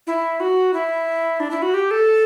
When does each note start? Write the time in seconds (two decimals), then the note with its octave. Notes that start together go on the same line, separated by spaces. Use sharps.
0.07 E4
0.40 F#4
0.74 E4
1.40 D4
1.51 E4
1.62 F#4
1.74 G4
1.91 A4